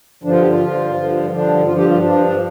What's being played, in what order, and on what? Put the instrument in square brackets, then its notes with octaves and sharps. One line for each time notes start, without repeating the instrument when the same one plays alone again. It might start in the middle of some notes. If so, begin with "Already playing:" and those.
[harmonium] G2 D3 F3 D4
F4
G4
F4
G2 D3 F3
G2 D3 F3
G2 D3 F3 D4
G2 F3 F4
G4
F4
G2 F3 D4
D4